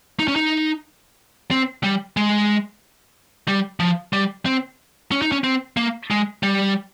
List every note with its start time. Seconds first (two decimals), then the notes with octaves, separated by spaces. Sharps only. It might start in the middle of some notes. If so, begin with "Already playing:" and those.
0.19 D#4
0.28 C#4
0.36 D#4
1.51 C4
1.84 G3
2.17 G#3
3.48 G3
3.80 F3
4.13 G3
4.46 C4
5.11 C#4
5.22 D#4
5.32 C#4
5.44 C4
5.77 A#3
6.11 G#3
6.43 G3